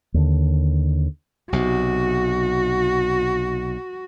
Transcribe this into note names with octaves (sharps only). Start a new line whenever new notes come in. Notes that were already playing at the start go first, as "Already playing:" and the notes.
D#2 D3
B1 C3 F#4